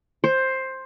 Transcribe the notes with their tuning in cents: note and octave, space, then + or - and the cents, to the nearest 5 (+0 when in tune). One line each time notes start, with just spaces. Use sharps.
C5 +10